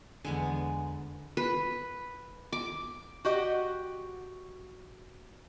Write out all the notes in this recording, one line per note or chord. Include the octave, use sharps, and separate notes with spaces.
E2 D3 G#3 B3 G#5
B4
D6
F#4 G4 D#5 F#5